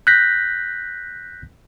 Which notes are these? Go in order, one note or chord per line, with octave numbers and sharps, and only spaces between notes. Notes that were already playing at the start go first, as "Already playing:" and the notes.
F#6 G6 A#6 B6